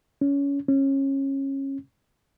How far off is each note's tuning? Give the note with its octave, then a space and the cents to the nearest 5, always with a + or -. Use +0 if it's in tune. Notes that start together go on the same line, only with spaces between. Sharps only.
C#4 +20
C#4 -25